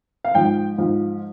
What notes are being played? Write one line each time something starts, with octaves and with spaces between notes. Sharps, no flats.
F5
G#2 F3 G5
G#2 F3